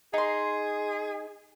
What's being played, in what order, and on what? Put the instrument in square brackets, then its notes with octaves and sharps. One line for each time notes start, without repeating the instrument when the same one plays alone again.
[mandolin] D#4 C6 [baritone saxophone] G#4